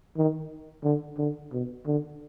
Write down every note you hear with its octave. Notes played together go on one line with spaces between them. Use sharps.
D#3
D3
D3
B2
D3